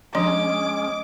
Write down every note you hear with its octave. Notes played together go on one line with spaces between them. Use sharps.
F3 G#3 C#4 D4 D#5 C6 D6